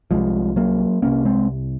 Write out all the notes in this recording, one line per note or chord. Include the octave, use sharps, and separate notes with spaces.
C2 C3 F3 G#3
F#3 A#3
C2 C3 A#3 C#4
G#3 C4